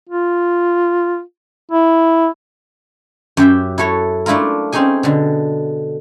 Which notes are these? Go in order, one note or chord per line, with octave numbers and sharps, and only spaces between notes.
F4
E4
F#2 G4 E5 G5
E4 F#4 A4 C#5
A3 D4 E4 F4 A#4
C4 C#4 D#4 G#4 G#5
B2 D3